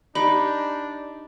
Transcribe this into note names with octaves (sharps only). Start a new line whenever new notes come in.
D4 D#4 G4 B5